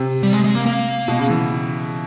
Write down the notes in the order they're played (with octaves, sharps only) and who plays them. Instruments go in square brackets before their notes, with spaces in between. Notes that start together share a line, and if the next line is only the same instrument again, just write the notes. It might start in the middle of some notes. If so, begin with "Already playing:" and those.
Already playing: [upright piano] C3
[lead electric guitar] G3
G#3
G#3
A#3
A#3
[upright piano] B2
C#3
E3